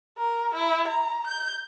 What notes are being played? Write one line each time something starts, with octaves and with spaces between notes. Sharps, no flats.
A#4
E4
A#5
G6